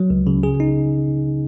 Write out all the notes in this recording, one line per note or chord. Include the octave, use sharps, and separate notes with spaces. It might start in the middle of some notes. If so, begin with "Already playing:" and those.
Already playing: F#3
C#2
C#3
G#4
D#4